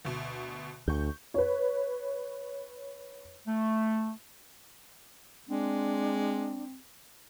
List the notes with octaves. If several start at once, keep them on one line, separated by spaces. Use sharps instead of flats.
D2 B2
D2 C#6 G6
B4 C#5
A3
G#3 C4 D4